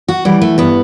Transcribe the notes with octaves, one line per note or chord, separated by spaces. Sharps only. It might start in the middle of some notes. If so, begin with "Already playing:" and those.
F#4
E3 G3
A3
G2 B3